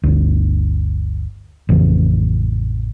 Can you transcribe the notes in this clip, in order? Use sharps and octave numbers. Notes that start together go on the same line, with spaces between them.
G1 D2
A1 F2 C#3 E3